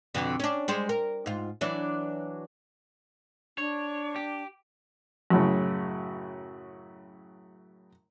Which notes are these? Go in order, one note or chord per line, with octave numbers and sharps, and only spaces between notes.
F2 B2 D3
C#4 D4
G3 G#3 C5
A#4
G#2 F4
E3 F#3 D4
D4 C#5
G4
F#2 A2 C#3